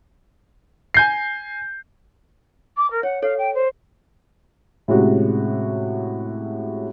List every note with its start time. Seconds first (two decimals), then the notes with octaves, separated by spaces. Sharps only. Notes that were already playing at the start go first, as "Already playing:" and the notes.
0.94 G#5 G6 C7
2.77 D6
2.90 A#4
3.03 C#5 F#5
3.22 A4 C#5 F5
3.38 G5
3.54 C5
4.88 A2 C3 G#3 C#4 F#4